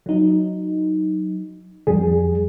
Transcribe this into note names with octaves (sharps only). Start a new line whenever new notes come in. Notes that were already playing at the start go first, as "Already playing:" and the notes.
F#3 D#4
F2 G3 G#4